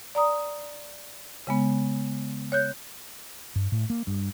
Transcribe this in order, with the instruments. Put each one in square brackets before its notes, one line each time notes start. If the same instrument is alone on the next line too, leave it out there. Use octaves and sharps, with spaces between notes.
[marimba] D5 A#5 D#6
C#3 G#3 B3
C#5 F#6 G6
[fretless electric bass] G2
A2
A#3
G2